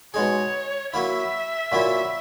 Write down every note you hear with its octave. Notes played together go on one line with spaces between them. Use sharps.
B2 G#3 D#4 G#4 C#5
F#3 A#3 E4 E5
A#2 F#3 A#3 E4